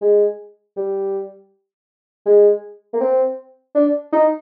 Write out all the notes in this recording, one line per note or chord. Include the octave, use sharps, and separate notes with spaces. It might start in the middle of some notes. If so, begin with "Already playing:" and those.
G#3
G3
G#3
A#3
C4
D4
D#4